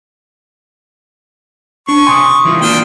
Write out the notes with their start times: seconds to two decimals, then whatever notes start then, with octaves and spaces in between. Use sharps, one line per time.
1.89 D4 C#6
2.07 C3 G#5 C6 D#6
2.45 E3 D#4 F4
2.61 A#3 D4 F4 F#4 G5